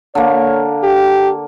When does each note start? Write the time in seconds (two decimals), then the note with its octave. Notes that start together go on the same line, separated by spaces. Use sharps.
0.15 D3 A#3 C#5
0.83 G4